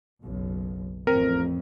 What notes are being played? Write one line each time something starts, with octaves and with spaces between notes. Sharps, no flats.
F#1 B1
A1 F2 C4 A#4